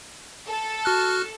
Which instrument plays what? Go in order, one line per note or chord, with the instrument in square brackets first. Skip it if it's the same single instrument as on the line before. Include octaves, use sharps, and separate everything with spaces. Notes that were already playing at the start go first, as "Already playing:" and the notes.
[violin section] A4
[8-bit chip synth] F#4 F6 F#6